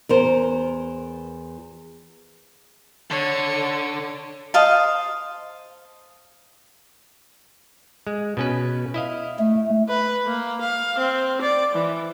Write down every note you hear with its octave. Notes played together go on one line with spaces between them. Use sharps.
E2 A#4 C5
D3 C#5
C5 D#5 F5 A5
G#3
B2 C#4 B4
E4 D#5 F5
A3
B4
A#3
F5
C4
D5
E3